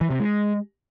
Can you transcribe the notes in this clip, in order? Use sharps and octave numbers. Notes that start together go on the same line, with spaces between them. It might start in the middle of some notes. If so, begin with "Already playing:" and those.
E3
C3
G#3